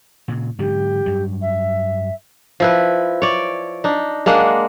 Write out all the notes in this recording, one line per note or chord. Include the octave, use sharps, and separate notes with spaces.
A#2 C#3
G#2 D3 F#3 G4
G2 F#3
E5
F3 E4 B4
C#5 D5
D4 D#4
G#3 A#3 D4 F#5